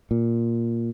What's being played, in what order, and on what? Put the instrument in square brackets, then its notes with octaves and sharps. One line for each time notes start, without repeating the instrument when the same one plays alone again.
[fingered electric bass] A#2